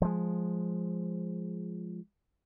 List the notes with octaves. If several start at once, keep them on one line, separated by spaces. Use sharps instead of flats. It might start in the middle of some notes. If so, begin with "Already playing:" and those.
F3 G#3